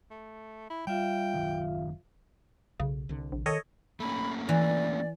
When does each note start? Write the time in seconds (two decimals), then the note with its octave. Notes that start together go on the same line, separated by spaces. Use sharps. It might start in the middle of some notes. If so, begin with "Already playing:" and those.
0.11 A3
0.70 E4
0.87 G3 F4 E5 F5 G5
1.34 F#1 D#3 F#3
2.80 B1 C#3
3.09 C2 D3
3.32 A#1
3.46 D#3 A4 C#5 D#5
4.00 A3 A#3 C#4 B5
4.49 E3 D5